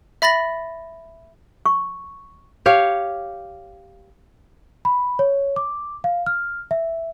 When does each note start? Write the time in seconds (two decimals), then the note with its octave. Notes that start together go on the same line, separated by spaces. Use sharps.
0.22 E5 B5 A6 A#6 F#7
1.66 C#6
2.66 G4 C#5 F5
4.85 B5
5.19 C#5
5.56 D6
6.04 F5
6.26 F6
6.71 E5